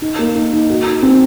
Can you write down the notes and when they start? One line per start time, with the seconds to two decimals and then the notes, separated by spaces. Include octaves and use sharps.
0.02 D#4
0.19 A#3
0.35 D#4
0.53 D#4
0.69 F#4
0.86 D#4
1.03 C4